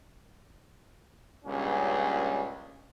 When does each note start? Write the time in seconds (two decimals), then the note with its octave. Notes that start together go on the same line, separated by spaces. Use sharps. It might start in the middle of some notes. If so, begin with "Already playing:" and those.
1.45 C#2 G2 A#2 C#4